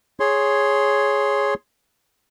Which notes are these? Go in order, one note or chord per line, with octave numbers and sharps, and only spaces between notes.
G#4 C#5 C6